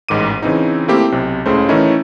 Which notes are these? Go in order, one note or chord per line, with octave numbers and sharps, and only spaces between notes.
A1 G#2 D#3 D6 D#7
C#3 E3 C4 D#4
A3 A#3 C4 E4 G4
B1 C3
C#2 A2 C#3 A3 C5
D#3 E3 A3 C#4 D#4 E4